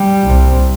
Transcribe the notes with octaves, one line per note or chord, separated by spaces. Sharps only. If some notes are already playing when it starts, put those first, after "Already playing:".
Already playing: G3
C2 C3